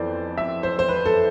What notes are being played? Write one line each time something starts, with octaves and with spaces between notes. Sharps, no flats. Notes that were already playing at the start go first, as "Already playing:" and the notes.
Already playing: F2 E3 B3 C5 D5
E5
C5
C5
B4
A4